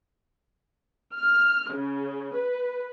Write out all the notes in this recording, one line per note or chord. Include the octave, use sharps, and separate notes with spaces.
F6
C#3
B4